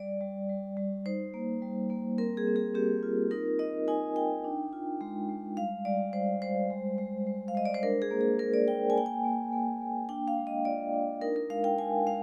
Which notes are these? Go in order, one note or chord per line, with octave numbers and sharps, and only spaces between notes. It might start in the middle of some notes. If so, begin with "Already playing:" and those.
Already playing: G3 D5
G3
G3
G3
D#4 C5
A#3
G3
A#3
C4 A#4
G#4
C4
G#4
C4 G4
F4
D#4 A#4
D#4 D#5
D#4 G#5
D#4 G5
D4
F4
G#3
G#3
G3 F5
G3 D5
G3 C5
G3 C5
G#3
G#3
G#3
F5
G#3 D#5
D5
C5
D4 A#4
G#4
A#3
G#4
A#3 A#4
D5
A#3 G5
G#5
A#3 G5
G#5
A#3
A#3
A#3
D4 G5
F5
G#3
D#5
F4 D5
D4
D#4 A#4
A#4
G#3 F5
G5
G#3 G#5
G#3 F5